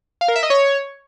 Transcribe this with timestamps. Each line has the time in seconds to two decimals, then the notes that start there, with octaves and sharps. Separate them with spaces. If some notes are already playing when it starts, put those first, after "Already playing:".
0.21 F5
0.28 A#4
0.36 E5
0.43 D#5
0.50 C#5